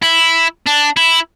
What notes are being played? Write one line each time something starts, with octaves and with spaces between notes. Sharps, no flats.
E4
D4
E4